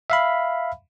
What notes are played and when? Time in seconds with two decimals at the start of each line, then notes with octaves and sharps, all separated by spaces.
0.10 E5 F5 B5